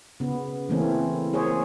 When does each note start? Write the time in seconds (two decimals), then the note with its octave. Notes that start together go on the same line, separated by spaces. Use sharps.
0.20 C#3 B3
0.69 C#3 E3 A3 A#3 C4 C#4
1.33 A#3 G#4 C5 C#5